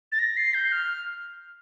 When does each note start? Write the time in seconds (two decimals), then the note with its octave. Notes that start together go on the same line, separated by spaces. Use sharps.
0.12 A6
0.19 A#6
0.37 C7
0.54 G6
0.72 F6